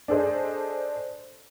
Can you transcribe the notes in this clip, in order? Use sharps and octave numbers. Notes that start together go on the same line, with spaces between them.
D4 G#4 A4 C5 D#5